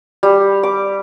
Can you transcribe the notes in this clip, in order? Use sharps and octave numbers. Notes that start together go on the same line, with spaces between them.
G3
D6